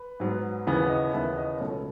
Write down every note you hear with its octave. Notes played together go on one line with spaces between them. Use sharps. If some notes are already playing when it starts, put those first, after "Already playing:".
Already playing: B4
G#2 F#3 B3
D#2 C#3 E3 B3
D#5
D#2 C#3 E3 B3 E5
D#5
C#2 B2 F#3 A3 C#5